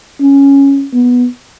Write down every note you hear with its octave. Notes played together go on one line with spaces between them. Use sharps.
C#4
B3